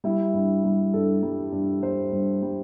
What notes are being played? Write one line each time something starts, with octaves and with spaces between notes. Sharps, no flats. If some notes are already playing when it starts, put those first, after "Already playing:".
G3 E4
G2
G3
G2 A4
G3
G2
G3 C5
G2
G3